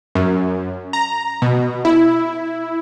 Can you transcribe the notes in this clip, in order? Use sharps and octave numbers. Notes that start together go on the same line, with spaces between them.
F#2
A#5
B2
E4